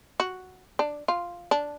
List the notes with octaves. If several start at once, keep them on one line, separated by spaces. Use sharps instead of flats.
F#4
D4
F4
D4